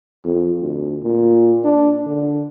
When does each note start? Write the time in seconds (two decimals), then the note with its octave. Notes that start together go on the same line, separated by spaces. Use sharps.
0.25 F2
0.61 D2
1.03 A#2
1.64 D4
2.06 D3